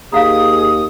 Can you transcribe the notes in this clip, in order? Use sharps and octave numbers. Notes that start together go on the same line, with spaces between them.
D#2 G#4 F5 F#5 A#5 D#6